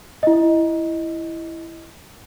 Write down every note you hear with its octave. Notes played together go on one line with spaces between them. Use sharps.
E4 D#5